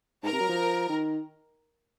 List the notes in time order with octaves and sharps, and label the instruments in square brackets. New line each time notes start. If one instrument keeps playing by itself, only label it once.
[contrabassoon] G#2 [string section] A#4 A#5
[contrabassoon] C3
F#3
F3
D#3